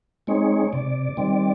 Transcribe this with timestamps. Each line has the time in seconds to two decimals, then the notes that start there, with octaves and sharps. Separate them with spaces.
0.27 G#3 C4 D#4 C#5
0.73 C3 D5
1.17 D#3 G3 C4